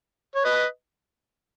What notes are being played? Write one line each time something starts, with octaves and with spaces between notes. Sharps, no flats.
C#5
B4 D#5